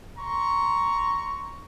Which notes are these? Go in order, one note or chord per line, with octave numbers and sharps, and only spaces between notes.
A#5 C6 C#6